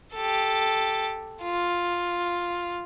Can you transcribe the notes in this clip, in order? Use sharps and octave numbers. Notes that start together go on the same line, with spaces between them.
G4 A4
F4